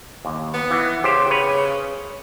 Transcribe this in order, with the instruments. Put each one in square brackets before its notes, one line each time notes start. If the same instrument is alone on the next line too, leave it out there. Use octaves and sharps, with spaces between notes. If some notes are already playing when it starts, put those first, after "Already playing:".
[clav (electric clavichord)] D#2
[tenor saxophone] B3
[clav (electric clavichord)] E3
[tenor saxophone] C#3 [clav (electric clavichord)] G4 C5
[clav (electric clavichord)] B4 C#5